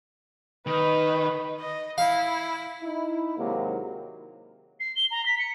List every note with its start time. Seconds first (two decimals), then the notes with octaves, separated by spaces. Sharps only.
0.67 D#3 B4
1.60 D#5
1.98 E4 F5
2.83 D#4 E4
3.37 D#2 C3 F#3 G#3 A#3
4.79 C7
4.95 G7
5.10 A#5
5.25 B6
5.38 C#7